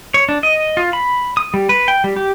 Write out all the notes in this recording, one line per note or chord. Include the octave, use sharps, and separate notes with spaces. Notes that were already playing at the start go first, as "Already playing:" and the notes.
C#5
D4
D#5
F4
B5
D#6
G3
B4
G5
G3
G4